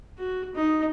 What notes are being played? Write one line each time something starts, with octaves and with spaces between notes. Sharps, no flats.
F#4
D#4